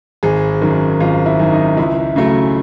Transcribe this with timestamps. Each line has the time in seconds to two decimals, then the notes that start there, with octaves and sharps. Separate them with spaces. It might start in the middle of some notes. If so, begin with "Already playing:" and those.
0.23 G#1 G#4
0.61 F#2 D#3
1.00 G#1 F4
1.26 E4
1.39 F#2 D#3
1.52 D#4
1.77 C#2 E4
2.16 C#3 F#3 A3